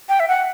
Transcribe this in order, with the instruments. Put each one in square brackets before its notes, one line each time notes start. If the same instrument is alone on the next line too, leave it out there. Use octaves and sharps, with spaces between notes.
[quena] G5
E5
F#5